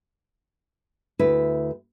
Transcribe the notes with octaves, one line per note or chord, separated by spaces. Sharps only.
D2 E4 B4